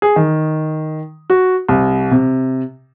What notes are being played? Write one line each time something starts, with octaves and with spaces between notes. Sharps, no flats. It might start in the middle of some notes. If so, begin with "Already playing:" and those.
G#4
D#3
F#4
C2
C3